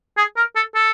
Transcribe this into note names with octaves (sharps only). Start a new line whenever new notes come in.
G#4
A#4
A4
A4